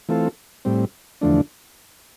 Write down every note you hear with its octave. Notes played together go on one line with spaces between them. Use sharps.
E3 A3 C4 F4 A4
A2 G3 C4
E2 D3 F3 A3 D4